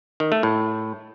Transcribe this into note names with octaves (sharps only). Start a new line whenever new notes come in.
D#3
A3
A2